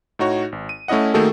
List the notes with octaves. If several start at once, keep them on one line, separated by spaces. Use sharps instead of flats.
A2 D#4 F#4 C#5
G#1
D#7
A3 C#4 E4 D#5 F#5
D#3 A3 A#3 F#4 G#4 A4